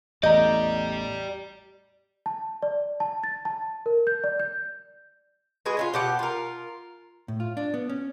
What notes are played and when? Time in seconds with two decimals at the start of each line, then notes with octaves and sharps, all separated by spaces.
0.23 A1 E2 A2 G4 D5 D#5 A#5 G6
2.26 A5
2.63 D5
3.00 A5
3.24 A6
3.45 A5
3.86 A#4
4.07 G6
4.24 D5
4.40 G6
5.66 G#3 F#4 G#4 B4
5.77 C#4 E4 F4
5.94 B2 G4 F#5
6.19 F4 A#4
7.28 A2
7.40 F4
7.57 D4
7.74 B3
7.89 C#4